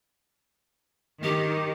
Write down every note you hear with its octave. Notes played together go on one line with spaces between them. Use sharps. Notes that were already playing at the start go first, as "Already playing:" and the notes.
D#3 G4